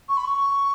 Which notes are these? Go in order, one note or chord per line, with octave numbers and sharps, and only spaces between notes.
C#6
B5
C#6